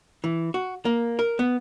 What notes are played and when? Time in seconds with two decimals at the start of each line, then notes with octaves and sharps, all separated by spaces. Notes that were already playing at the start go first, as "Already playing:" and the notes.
0.24 E3
0.54 F#4
0.85 A#3
1.19 A#4
1.39 B3